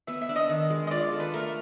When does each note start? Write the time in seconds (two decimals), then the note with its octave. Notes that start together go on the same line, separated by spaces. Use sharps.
0.07 B3 E5
0.22 E5
0.29 D4
0.36 D#5
0.49 D#3
0.70 G#3
0.87 D#5
0.91 F4 D5
1.13 A4
1.20 B4
1.34 A3 A#4